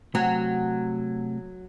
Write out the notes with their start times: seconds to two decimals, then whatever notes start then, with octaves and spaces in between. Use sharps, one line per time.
0.15 C3 F#3 A3 G5